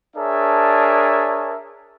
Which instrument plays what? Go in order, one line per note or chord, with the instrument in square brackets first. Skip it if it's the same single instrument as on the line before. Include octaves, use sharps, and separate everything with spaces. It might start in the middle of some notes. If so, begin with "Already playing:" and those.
[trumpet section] D4 G#4 A#4 C#5 E5 A5